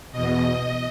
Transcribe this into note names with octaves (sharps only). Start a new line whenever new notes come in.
E2 B2 D#5